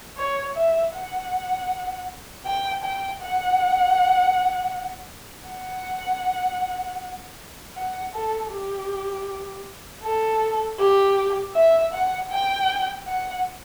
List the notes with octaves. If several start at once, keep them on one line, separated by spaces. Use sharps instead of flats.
C#5
E5
F#5
G5
G5
F#5
F#5
F#5
A4
G4
A4
G4
E5
F#5
G5
F#5